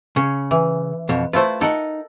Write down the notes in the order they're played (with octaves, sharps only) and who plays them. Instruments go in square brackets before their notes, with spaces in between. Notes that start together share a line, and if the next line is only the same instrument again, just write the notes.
[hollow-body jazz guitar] C#3 [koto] C#4
[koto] E3
[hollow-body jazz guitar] F2 B2
[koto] A3 E4 F4 [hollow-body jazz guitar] B4 C5
[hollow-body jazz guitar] D#4 [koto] A4 A#4 F#5